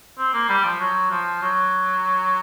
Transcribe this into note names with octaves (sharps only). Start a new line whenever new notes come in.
C4
A#3
G3
F3
F#3
F3
F#3